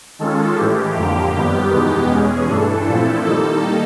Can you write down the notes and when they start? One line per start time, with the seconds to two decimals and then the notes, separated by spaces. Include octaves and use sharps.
0.19 D#3 G#3 C#4 F4 A4
0.57 A2 E3 G#3 G4
0.96 F2 D3 F3 A#3 G4
1.34 F#2 D#3 G3 B3 G4
1.72 E2 B2 G#3 B3 D#4
2.11 E2 B2 G#3 C#4 G#4
2.49 G2 E3 A3 D4 A4
2.88 A#2 F3 A3 C4 E4
3.25 D#3 G3 A#3 D#4 A4